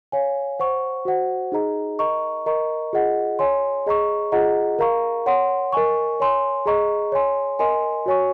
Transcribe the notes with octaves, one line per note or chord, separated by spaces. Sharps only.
C#5 F5 G#5
C5 F#5 C#6
F#4 C5 F#5
D#4 G#4 D#5 A#5
A#4 D#5 A#5 C#6
A#4 D#5 A#5 C#6
F4 G#4 D#5 F#5
C#5 G#5 C6
G#4 D#5 A#5 C#6
F4 G#4 D#5 F#5 A#5
A#4 F5 A#5 C#6
C#5 F#5 C6
A#4 D#5 G#5 C#6
C#5 G#5 C6
G#4 D#5 A#5 C#6
C#5 G#5 C6
A#4 D#5 G#5 C6
F#4 C#5 G#5 C#6